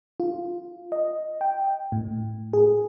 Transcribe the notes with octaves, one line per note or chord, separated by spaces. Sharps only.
F4
D#5
G5
A2
G#4